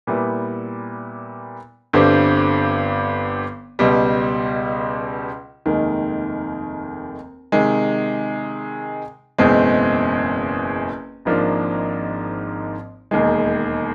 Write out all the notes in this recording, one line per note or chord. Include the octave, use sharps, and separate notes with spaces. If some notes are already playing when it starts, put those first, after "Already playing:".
A#2 G3 B3 E4
G1 G2 D3 G3 C4
C#2 B2 G3
F1 D#2 D#3 G#3
C3 D#3 G#3
F#1 E2 B2 G#3 C4
G#1 G#2 F3 A#3 D4
E1 D#2 D#3 G#3